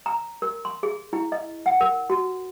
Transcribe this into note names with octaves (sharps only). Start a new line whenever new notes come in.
A#5
A#4
C6
G#4
E4
D#5
F#5
A#4
F#4